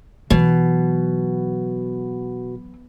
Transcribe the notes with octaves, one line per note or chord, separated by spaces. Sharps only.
B2 E3 F#3